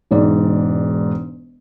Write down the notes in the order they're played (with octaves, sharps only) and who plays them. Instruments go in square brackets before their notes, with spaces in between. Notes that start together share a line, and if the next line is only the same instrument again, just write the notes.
[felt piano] E1 G#2 D5